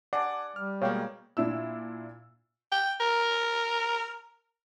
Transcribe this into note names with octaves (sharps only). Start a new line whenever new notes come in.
D5 F#5 G#5 A5
G3 F6
B2 G#3 A#3 C#5 F5 G5
A#2 D4 E4 E6
G5
A#4